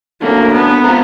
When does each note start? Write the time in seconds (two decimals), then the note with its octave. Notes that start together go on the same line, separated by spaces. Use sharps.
0.22 D3 F#3 A3 A#3 C#4
0.53 B3
0.84 G#3 C4 F4 A#4